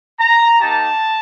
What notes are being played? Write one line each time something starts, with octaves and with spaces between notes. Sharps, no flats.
A#5
A#3 D#4 G4 A5